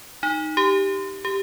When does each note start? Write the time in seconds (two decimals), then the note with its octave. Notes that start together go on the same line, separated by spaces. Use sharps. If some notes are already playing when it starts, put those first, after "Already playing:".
0.23 D#4
0.57 G4
1.25 G4